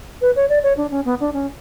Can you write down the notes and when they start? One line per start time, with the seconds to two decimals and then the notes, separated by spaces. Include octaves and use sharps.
0.21 B4
0.36 C#5
0.49 D5
0.63 C#5
0.77 D4
0.91 C#4
1.05 B3
1.20 D4
1.34 C#4